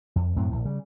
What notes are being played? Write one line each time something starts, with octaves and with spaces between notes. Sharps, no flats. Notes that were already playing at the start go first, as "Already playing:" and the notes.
F2
F#2 A2 F#3 C4
A#1 A2
C#3 G3